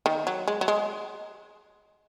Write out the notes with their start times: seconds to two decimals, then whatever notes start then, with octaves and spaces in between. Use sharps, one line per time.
0.06 D#3
0.27 F#3
0.48 G#3
0.61 F#3
0.68 G#3